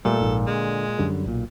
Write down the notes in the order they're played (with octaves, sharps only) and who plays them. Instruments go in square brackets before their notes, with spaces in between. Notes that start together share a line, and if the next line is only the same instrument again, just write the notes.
[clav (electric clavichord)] A#2 [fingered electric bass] G3 A3 [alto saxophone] A4
[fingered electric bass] A#1 G#2
[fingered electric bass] D3 [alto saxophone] G#3
[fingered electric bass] F#2 D3 G3
B1 A#2